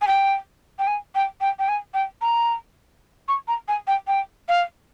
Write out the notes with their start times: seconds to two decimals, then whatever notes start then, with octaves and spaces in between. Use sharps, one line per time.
0.02 G#5
0.07 G5
0.79 G5
0.87 G#5
1.15 G5
1.41 G5
1.59 G5
1.68 G#5
1.94 G5
2.21 A#5
3.28 C#6
3.48 A#5
3.68 G#5
3.87 G5
4.07 G5
4.49 F5